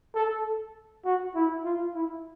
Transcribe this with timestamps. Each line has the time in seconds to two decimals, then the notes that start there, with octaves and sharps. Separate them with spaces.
0.15 A4
1.05 F#4
1.35 E4
1.64 F4
1.94 E4